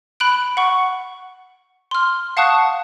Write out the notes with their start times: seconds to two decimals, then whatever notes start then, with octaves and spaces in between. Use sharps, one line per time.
0.20 B5 F#6 D7
0.57 F#5 C#6
1.91 C6 F6
2.37 F5 F#5 A5 C#6 D#6 F#6